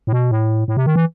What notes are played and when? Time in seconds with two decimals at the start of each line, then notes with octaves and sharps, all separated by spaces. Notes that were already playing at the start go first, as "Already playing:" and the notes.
0.07 A2
0.13 B2
0.31 A2
0.68 A2
0.77 C3
0.86 D#3
0.96 E3